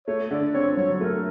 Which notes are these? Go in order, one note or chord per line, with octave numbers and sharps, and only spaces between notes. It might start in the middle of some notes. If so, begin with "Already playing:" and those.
A3 C#5
D3 D5
C4 C#5
F#3 C#5
A3 A#4